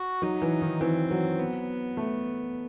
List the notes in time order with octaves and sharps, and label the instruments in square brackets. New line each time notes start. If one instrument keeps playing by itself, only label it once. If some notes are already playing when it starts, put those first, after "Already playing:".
Already playing: [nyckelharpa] F#4
[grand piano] F#3 [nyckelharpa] D#4
[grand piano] E3
D#3
[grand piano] E3 [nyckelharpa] C4
[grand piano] F#3
[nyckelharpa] B3
[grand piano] A3